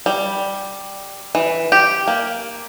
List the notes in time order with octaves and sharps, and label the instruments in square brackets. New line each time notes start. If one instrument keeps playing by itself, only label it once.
[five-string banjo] G3
E3
G4
A#3